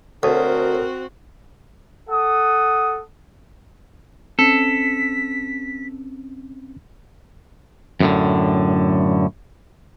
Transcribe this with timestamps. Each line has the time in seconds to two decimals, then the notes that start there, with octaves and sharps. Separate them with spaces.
0.23 D2 C4 F#4 A4 A#4 C#5 D#6
2.10 A4 F#5 D#6
4.39 C4 C#4 A4 B6
8.00 F#2 A2 D3